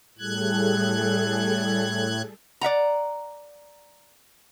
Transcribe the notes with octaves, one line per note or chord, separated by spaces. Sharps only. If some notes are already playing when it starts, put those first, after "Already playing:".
A2 G3 G#4 A4 F#6 G#6
D5 E5 F#5 A#5